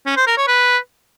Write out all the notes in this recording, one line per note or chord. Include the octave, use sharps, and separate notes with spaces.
C#4
C5
A#4
C#5
B4